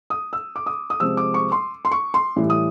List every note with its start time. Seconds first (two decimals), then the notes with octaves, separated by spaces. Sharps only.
0.10 D#6
0.33 E6
0.56 D6
0.66 D#6
0.90 D#6
1.00 C3 F3 G#3 C4 E6
1.17 D6
1.34 C#6
1.52 C6
1.85 C6
1.91 C#6
2.14 C6
2.36 A2 E3 G3
2.50 D#6